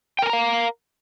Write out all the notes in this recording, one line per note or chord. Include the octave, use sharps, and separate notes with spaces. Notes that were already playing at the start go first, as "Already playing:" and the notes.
A#4 F5 G5 G#5 A#5